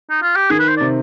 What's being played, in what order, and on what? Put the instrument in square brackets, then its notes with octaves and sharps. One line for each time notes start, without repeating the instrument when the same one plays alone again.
[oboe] D#4
F4
G4
[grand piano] D#3 [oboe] G#4
[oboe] B4
C5
[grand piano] C3 [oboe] D5